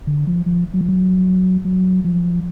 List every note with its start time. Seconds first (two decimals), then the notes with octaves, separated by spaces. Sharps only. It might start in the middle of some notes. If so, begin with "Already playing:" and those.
0.07 D3
0.27 F3
0.46 F3
0.74 F#3
0.81 F3
0.89 F#3
1.65 F#3
2.04 F3